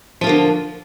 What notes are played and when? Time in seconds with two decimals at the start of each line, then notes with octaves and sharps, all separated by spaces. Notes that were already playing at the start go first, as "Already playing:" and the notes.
0.21 F3
0.24 F4
0.26 A#3
0.29 D3